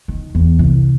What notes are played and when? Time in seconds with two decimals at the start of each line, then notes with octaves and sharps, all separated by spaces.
0.08 D#3
0.35 E2
0.59 C2